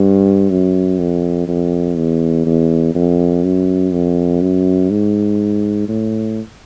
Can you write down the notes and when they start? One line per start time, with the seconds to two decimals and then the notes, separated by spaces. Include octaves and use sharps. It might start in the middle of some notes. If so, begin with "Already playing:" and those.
Already playing: G2
0.50 F#2
0.99 F2
1.48 F2
1.97 E2
2.46 E2
2.95 F2
3.44 F#2
3.93 F2
4.41 F#2
4.90 G#2
5.89 A2